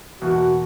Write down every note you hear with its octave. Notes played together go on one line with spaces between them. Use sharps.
E2 B2 A#3 E4 F#4